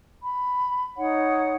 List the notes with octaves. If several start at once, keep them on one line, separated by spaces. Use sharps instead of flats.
B5
D#4 C#5 F#5